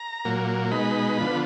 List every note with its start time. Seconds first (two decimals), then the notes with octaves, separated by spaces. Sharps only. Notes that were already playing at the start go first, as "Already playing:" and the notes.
Already playing: A#5
0.25 A#2 F#3 A#3
0.71 B2 G#3 D#4 B5
1.18 D3 F3 B3